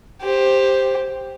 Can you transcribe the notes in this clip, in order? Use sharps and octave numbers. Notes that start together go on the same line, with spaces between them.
G4 C5